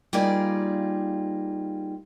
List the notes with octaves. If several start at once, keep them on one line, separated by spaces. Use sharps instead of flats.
G3 A#3 D#4 F4 G#4 D5